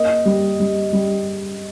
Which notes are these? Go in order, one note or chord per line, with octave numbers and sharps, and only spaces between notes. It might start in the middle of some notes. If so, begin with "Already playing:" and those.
Already playing: A#3 D#5
G3
G3
G3